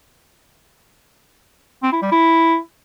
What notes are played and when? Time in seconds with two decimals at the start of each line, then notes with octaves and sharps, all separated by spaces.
1.83 C4
1.92 E4
2.02 G3
2.12 E4